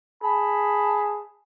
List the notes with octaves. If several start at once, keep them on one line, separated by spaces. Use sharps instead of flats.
G#4 A5 B5